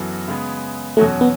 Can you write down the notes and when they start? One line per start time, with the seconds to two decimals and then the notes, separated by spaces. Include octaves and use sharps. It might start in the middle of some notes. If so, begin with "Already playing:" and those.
Already playing: F#2 E3 B3 F#4 A4
0.28 C#3 G#3 B3
0.97 E2 B2 F#3 A3 C#4 F#4
1.21 B3